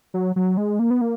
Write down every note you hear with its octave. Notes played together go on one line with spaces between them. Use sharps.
F#3
F#3
G#3
A#3
B3
A#3